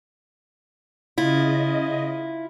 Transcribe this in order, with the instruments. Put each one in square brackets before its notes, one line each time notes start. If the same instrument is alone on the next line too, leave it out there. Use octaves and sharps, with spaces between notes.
[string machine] C#3 D#5 [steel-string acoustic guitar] E4 F4